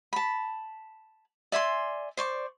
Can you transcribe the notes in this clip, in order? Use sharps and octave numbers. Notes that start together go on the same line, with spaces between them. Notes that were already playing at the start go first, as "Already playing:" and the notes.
A5 B5
D5 E5 G#5 C6
C5 D5 C#6